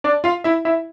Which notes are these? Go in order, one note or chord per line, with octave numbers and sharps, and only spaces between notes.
D4 D5
F4 F5
E4 E5
E4 E5